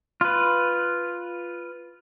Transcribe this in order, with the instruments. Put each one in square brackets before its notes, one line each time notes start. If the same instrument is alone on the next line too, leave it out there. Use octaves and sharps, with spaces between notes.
[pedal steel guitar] F4 B4